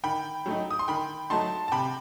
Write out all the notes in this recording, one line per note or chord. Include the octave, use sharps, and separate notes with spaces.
D#3 G5 B5
F#3 A3 D#4
D#6
C6
D#3 G5 B5
F#3 A3 D#4 A5 C6
A5
C3 G5 B5